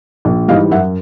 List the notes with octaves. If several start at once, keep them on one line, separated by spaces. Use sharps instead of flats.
A#1
G#2 E3 G3 D#5 F5
F#2 E5 F#5